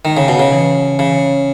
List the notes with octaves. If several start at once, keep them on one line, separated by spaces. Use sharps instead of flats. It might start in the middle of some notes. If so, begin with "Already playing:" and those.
D#3 G#3
C#3
B2
C#3
E3
C#3 E3